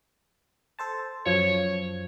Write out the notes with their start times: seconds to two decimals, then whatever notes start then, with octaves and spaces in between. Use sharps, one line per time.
0.79 A4 C5 A5
1.26 F#2 F3 C#5